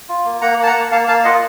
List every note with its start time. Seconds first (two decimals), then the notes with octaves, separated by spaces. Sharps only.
0.09 F4
0.25 A#3
0.41 A#3 F#5 A#5
0.58 A#3 A5
0.67 F#5 A#5
0.75 A#3
0.91 A#3 F5 A5
1.08 A#3 F5 A5
1.24 F4 D#5 F#5